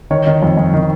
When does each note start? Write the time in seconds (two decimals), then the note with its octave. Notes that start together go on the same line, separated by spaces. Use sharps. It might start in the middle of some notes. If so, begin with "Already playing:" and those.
0.11 D#3 C#5
0.27 D#3
0.42 F2
0.57 F2
0.74 D#3